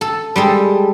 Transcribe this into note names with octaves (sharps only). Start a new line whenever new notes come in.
A4
G3 G#3 A4